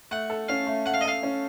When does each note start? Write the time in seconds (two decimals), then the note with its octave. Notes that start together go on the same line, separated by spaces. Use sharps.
0.11 A3 F#5
0.30 A4
0.49 C#4 F5
0.67 A3
0.86 A3 F#5
0.94 F5
1.01 D#5
1.05 A4 F5
1.23 C#4